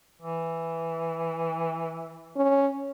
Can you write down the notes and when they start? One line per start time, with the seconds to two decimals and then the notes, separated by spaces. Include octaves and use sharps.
0.22 E3
2.36 C#4